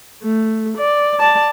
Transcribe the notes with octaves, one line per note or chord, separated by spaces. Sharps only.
A3
D5
D5 A5